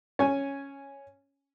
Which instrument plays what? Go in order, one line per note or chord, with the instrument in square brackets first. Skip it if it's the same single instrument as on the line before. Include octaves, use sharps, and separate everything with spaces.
[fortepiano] C#4 G#5